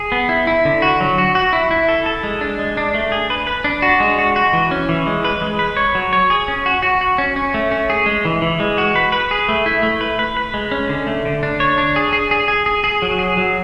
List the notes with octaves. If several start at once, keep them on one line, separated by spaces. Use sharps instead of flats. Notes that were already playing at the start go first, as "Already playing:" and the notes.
Already playing: G#4
B3
E4
E4
D3
F#4
F#3
F#4
F#4
E4
E4
A4
A4
G#3
D4
G#3
D4
A3
G#4
B4
B4
D4
F#4
G#3
F#4
F#4
E3
C#4
E3
G#3
B4
G#3
B4
C#5
F#3
C#5
G#4
C#4
F#4
F#4
F#4
C#4
C#4
A3
C#4
G#4
G#3
E3
E3
G#3
F#4
B4
B4
G#4
A3
E4
A3
B4
B4
B4
G#3
C#4
D3
A3
D3
D4
C#5
D4
G#4
G#4
G#4
G#4
G#4
G#4
F#3
G#4
F#3